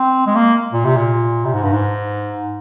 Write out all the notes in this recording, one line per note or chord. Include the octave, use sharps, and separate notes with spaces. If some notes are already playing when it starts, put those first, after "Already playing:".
Already playing: C4
G#3
A#3
A#2
C3
A#2
C3
G#2
G2
G#2